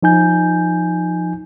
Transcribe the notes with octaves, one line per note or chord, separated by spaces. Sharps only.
F3 D#4 G#5 G6